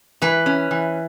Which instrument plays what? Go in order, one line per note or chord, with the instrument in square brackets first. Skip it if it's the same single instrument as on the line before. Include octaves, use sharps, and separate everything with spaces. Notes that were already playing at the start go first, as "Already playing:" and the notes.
[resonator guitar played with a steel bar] E3 [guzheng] B4
[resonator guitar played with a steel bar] C#4
E3